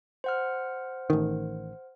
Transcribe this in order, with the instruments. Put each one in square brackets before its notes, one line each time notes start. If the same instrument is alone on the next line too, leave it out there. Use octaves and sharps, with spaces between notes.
[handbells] C5 F#5 F6
[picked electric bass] A1 D#3